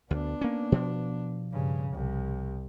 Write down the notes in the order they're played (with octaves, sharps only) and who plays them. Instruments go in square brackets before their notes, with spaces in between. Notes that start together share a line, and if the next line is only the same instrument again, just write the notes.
[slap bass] D2 [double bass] B3 D4
[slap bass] A#3 C#4
B2 F3
[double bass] G2 C#3
C2